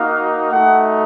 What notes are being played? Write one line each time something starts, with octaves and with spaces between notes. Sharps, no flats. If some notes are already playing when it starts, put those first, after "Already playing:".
Already playing: A#3 D#4 F#4 F5
A3 D#4 F#4 F#5